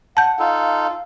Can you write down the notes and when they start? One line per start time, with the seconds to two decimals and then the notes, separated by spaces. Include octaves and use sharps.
0.17 F#5 A5 G6
0.39 D#4 F4 A4 F5